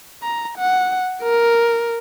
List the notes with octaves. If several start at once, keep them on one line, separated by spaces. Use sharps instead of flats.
A#5
F#5
A#4